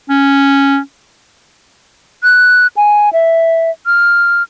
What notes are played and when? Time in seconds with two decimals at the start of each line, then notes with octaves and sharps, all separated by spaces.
0.10 C#4
2.23 F#6
2.77 G#5
3.13 E5
3.86 F6